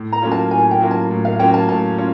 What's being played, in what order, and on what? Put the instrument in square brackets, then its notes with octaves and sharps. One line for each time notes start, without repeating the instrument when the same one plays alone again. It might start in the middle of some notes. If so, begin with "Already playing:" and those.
Already playing: [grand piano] A2
[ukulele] A#5
[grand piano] F#3 A#3 C#4 F4
[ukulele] A5
[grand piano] A2 [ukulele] G#5
[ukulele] G5
[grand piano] F#3 A#3 C#4 F4
[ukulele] A5
[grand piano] A2
[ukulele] F5
[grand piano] F#3 A#3 C#4 F4 [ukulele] G5
[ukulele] A5
[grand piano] A2 [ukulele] A5
[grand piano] C#4 F4